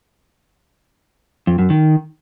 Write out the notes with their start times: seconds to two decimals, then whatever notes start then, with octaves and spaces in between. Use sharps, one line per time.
1.47 F2
1.59 F#2
1.70 D#3